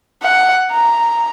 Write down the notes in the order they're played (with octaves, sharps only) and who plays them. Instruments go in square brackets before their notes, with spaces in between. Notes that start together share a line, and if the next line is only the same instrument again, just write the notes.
[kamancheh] F#5
A#5